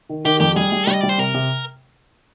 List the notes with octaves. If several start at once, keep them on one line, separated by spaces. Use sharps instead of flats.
D#3
D#3 G4
F2 G4
G3 G#4
G3
G3 D#5
G3 D5
C5
C3 A#4
C3